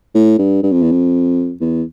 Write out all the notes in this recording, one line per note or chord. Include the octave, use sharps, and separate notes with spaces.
A2
G2
G2
F2
E2
F2
E2